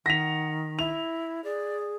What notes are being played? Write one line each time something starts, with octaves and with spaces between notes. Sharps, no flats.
D#3 F#5 A#6 B6 F7
E4 F7
G#4 D5